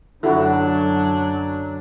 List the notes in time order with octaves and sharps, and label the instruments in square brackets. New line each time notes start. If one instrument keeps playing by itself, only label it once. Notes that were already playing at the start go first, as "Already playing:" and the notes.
[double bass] F#2 F#3 [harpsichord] D3 [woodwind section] D4 [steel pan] E4 F#4